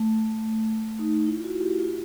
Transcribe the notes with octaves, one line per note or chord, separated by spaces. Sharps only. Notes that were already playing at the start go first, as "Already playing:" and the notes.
Already playing: A3
D#4
E4
F4
F#4
G4
F4